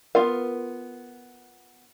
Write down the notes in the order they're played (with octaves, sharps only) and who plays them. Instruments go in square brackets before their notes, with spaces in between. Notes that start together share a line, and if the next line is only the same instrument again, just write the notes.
[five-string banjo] B3 F4 F5 [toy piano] A#4